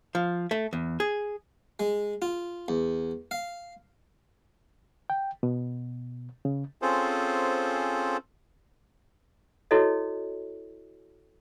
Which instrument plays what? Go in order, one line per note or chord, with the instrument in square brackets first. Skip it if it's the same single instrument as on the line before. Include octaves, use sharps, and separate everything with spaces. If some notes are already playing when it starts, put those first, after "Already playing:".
[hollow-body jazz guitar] F3
A3
E2
G#4
[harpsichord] G#3
F4
E2
F5
[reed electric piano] G5
B2
C#3
[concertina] C4 C#4 F4 G#4 A4 C5
[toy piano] E4 F#4 A4 C#5 D#5